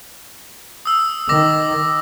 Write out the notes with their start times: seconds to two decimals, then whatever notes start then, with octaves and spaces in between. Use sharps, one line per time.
0.85 D#6 E6
1.29 D#3 D6 A#6